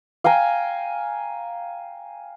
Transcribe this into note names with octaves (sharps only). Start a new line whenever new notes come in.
F5 G5 G#5 A#5